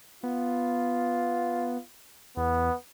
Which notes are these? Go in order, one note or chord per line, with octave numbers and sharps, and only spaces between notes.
B3 F4
E2 B3